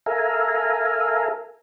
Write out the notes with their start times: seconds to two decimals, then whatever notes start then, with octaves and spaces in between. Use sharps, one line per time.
0.06 A4 A#4 E5 F5 G#5 A#5